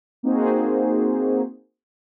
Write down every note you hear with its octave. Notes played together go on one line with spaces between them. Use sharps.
A#3 C4 D#4 F#4 G#4 C5